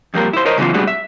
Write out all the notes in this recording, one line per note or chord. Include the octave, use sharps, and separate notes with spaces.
F2 G3 A#3 A#4
E4 C5
A#4 C5 C#5 D#5 A#5
C#3 E3 F#3 B3 F4
G3 A3 B3 D4 F#4 G#4
E5